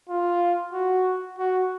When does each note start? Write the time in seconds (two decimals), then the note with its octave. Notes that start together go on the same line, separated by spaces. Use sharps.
0.09 F4
0.73 F#4
1.38 F#4